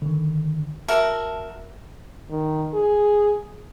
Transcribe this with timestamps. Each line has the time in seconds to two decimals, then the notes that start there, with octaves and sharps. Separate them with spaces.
0.02 D3 D#3
0.88 F#4 A#4 E5 A5 F6
2.30 D#3
2.74 G#4